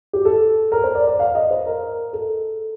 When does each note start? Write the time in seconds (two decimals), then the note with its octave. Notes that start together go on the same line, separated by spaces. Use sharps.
0.13 G4
0.25 A4
0.72 A#4
0.84 C5
0.95 D5
1.07 D5
1.19 F5
1.35 D#5
1.51 C5
1.66 A#4
2.13 A4